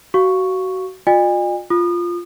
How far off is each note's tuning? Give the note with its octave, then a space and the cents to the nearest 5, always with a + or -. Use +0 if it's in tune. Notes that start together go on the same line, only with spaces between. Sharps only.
F#4 +20 F5 +0 C#6 +0
F4 +35 D#5 -45 G#5 -40
F4 +0 D#6 -35